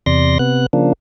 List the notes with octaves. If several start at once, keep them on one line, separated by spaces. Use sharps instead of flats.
E2 C3 D5 C6 A#6
C3 B3 F#6
C#3 F3 A#3 D4